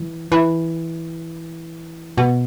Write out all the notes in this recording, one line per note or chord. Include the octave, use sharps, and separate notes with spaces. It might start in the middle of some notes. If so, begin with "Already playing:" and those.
Already playing: E3
E3
B2